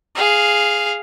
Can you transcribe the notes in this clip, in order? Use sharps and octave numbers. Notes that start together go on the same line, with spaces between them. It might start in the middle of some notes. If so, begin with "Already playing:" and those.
G#4 F5